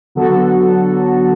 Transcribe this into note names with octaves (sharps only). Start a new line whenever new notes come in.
D3 F#3 B3 F#4 A4